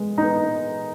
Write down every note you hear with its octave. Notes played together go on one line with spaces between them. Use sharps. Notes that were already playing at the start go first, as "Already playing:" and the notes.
Already playing: G#3 B3
B3 D#4